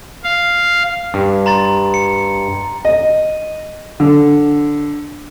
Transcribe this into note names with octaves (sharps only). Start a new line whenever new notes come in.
F5
G2
A#5 C6 A6
C#7
D#5
D3